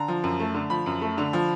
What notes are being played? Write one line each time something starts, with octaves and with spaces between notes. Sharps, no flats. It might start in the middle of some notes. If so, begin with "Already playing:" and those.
Already playing: D3 A#5
F3
F#2
A3
D3
F3 B5
F#2
A3
D3
F3